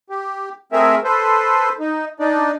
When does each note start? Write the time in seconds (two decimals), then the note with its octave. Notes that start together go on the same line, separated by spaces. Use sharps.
0.10 G4
0.72 A3 C4 G#4 A#4 E5
1.04 A4 B4 C5
1.80 D#4
2.20 D4 D#4 D5